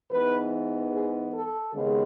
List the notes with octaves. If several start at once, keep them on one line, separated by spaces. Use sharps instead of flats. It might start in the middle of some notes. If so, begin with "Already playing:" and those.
G#2 E3 B3 B4
G#4
A4
D#2 C#3 G#3 B3